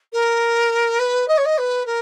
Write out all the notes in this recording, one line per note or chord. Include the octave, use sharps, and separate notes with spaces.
A#4
B4
D#5
C#5
D#5
B4
A#4